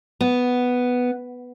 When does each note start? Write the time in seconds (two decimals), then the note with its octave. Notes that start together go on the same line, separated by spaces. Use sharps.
0.21 B3